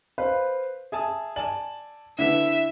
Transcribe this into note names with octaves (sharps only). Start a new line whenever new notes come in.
B4 C5 F5
G#4 E5 G#5 A5 D#6
D5 G#5 A5 F#7
D3 E4 B4 E5